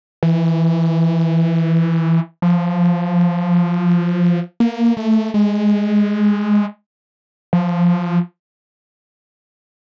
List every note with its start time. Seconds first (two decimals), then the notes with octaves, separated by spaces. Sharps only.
0.23 E3
2.42 F3
4.60 A#3
4.97 A3
5.34 G#3
7.53 F3